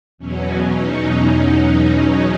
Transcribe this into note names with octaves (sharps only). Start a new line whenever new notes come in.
E2 B2 F#3 C#4
D#4